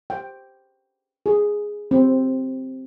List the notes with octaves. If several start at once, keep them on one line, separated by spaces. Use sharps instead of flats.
G5
G#4
C4